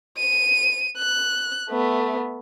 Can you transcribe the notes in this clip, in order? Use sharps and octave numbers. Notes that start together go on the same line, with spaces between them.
D#7
F#6
A3 B3